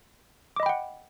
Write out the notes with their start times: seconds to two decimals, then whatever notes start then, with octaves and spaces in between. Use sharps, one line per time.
0.56 D6
0.60 D#5
0.63 B5
0.66 G5
0.69 F#5